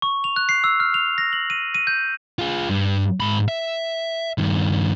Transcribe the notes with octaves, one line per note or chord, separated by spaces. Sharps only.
C#6
F7
F#6
C7
E6
F6
F7
A#6
F#7
D#7
D#7
G6
F4 G#4
G2
G#2 B5
E5
G2 D#3